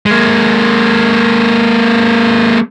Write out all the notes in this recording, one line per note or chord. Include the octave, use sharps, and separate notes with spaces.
G#3 A#3